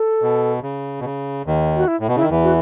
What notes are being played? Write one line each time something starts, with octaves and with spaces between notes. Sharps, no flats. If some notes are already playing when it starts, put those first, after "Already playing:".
Already playing: A4
B2
C#3
B2
C#3
D#2 D#3
F#4
E4
A2
B2
C#3 E4
D#3
E2 E3
F#4